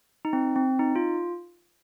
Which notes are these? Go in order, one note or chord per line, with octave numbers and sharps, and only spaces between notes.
D#4
C4
C4
D#4
F4